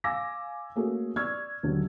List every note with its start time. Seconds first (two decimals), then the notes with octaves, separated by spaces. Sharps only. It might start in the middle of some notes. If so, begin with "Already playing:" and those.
0.04 F5 G#5 D6 E6 A#6
0.76 A3 A#3 C#4 F#4 G#4 A4
1.16 D5 C#6 E6 F6 G#6
1.63 D#1 D3 F#3